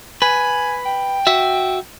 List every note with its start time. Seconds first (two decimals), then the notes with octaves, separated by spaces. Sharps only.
0.22 B4 G#5
0.86 G5
1.27 F#4 E5